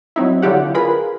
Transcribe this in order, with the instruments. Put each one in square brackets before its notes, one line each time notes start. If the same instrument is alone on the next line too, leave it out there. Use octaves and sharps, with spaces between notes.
[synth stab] F#3 C4 D#4 E4
D3 F#3 E4 F4 G4 F#5
F4 G#4 A#4 B4 B5